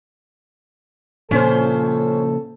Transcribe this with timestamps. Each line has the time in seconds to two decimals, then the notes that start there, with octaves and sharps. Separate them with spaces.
1.31 A#2 C#3 F3 C#4 A4 C5